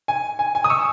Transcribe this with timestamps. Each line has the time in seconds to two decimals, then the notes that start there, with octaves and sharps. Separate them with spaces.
0.08 G#5
0.39 G#5
0.55 G#5
0.64 D#6
0.70 C#6 E6